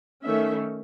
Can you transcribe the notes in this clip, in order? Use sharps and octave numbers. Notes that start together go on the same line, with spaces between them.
D#3 A3 C#4 E5